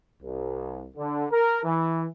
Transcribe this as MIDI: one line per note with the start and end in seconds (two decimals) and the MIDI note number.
0.22 0.88 36
0.97 1.25 50
1.31 1.59 70
1.65 2.07 52